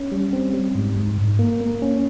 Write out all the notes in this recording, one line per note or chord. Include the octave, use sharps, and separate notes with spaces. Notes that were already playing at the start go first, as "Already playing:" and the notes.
Already playing: C#4
G3
C4
G3
G#2
G#2
G#2
A#3
A#3
C#4